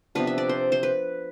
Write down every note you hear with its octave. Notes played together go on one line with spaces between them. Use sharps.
C3 F3 B3 D4 B4
E5
D5
C5
C5
B4